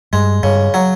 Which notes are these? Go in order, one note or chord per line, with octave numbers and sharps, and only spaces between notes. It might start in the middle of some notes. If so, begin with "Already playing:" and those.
G2 G#3
G2 C#3
F#3